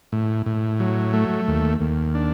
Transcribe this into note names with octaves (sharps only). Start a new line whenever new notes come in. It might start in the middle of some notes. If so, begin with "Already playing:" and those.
A2
A2
F#3
A3
D#2
D#2
D4